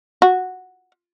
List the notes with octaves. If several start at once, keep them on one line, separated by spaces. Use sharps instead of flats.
F#4